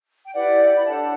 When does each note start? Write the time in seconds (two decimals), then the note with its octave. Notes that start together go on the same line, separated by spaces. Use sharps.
0.24 G5
0.34 E4 G4 B4 D5 F#5
0.76 B5
0.86 D4 A4 C#5 F#5 A5